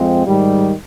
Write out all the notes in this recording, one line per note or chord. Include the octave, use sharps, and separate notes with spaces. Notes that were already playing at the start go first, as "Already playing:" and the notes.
Already playing: F2 G#3 C4 F4
G#2 D#3 G3